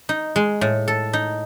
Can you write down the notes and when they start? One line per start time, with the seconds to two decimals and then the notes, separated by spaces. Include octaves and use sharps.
0.09 D#4
0.36 G#3
0.61 A2
0.88 A4
1.13 D#4